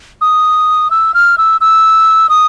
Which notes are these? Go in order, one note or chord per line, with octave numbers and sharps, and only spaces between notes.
D#6
E6
F6
E6
E6
D#6